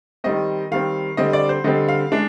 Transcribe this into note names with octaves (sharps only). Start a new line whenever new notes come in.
D#3 G3 C4 D#5
D#3 G3 C4 F5
D3 G3 C4 D#5
D5
C5
D3 G3 C4 D#5
F5
G#3 D4